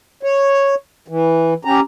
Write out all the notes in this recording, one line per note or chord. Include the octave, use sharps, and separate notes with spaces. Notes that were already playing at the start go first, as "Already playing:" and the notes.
C#5
E3
C#4 G4 A#5